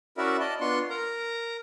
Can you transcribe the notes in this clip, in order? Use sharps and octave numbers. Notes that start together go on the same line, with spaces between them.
C#4 E4 F#4 A#4 D5 E5
D5 D#5 A5
B3 D4 F4 C6 C#6
A#4 A#5